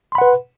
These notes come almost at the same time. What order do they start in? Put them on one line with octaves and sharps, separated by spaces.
C6 B5 F#5 B4